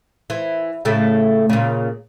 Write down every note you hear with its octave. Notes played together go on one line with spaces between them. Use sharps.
E3
A2 C#3 A3
A#2 C#3